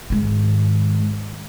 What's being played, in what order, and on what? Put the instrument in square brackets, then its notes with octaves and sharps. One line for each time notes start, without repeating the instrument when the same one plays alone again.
[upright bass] G#2 D#3